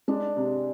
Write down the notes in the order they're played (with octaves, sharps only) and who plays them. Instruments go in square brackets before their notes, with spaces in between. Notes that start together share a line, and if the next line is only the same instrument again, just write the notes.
[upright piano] G#3 [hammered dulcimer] D4
[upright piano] C3